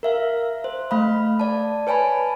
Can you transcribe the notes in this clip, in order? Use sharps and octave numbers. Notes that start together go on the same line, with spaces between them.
A#4 E5 F5
C5
A3 F5 B5
D5 A5
B4 C#5 G#5 A5 B5